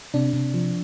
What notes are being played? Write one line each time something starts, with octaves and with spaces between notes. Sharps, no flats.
C3 D4
C3
F3